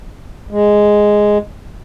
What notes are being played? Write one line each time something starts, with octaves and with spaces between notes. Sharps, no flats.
G#3